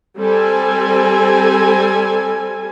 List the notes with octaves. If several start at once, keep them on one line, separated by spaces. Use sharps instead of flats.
G3 C4 A4 G#5